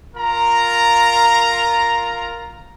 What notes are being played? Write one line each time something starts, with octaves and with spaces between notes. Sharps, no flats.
F4 A#4 A#5